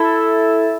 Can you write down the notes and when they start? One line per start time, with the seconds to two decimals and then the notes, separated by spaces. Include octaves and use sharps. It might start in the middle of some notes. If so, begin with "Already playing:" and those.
Already playing: E4 A4 E5